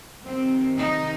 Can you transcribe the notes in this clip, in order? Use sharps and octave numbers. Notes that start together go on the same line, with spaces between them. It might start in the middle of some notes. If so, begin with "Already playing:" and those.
F2 C3 D#3 C4
D#4